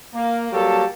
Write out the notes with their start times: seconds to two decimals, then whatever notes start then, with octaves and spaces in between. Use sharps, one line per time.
0.15 A#3
0.52 F#3 G3 A#3 G4 A4